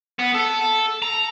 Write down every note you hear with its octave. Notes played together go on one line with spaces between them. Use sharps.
B3
A4
A#5